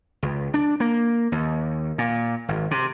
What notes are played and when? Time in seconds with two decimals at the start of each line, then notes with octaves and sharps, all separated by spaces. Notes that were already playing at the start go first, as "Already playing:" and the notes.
0.23 C#2
0.54 D4
0.80 A#3
1.32 D#2
1.98 A#2
2.48 G#1
2.71 C3